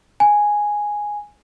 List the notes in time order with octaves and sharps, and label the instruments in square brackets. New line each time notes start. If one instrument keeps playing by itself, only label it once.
[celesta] G#5